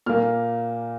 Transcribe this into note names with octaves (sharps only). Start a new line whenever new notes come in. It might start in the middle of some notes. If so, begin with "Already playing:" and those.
A#2 A#3 F6